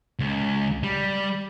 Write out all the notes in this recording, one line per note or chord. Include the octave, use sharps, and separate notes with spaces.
C#2
G3